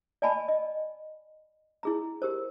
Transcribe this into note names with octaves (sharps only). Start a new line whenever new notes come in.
D5 D#5 G#5 A5 B5
D#5
E4 G#4 A#5
G4 A#4 C5